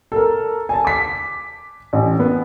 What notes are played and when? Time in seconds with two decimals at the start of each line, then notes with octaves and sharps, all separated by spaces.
0.12 A4 A#4
0.69 G#5 A5
0.85 D6 B6
1.93 A1
2.20 B3